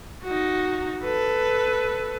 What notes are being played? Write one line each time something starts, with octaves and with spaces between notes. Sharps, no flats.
D#4 F#4
A4 B4